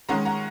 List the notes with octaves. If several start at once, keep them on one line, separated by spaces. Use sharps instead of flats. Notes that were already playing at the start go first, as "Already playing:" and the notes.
D#3 G#3 C#4 F#5 A#5
F#5 A#5